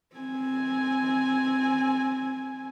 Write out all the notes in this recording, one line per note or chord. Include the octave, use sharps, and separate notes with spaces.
C4 G#5